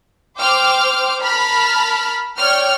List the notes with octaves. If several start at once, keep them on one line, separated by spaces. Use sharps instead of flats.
C5 G5 D6 F6
A#4 A5 B5 F6
C#5 D5 G5 F6